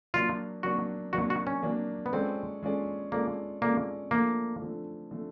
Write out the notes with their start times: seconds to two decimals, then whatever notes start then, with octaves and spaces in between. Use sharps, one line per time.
0.14 F#3 A#3 D4 F4
0.63 F#3 A#3 D4 F#4
1.13 F#3 A#3 D4 F#4
1.30 F#4
1.47 C#4
1.63 F#3 A#3 D4
2.06 B3
2.13 G#3 C4 C#4 F4 A4 D5
2.63 G#3 C#4 F4 A4 D5
3.12 G#3 A#3 C#4 F4 A4 D5
3.62 G#3 A#3 C#4 F4 A4 D5
4.11 D3 F3 A3 A#3
4.62 D3 F3 A3
5.11 D3 F3 A3